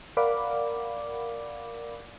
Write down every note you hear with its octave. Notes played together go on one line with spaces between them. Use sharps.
A#4 D5 F5 F#5 B5 D6